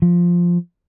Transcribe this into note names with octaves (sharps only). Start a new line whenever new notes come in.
F3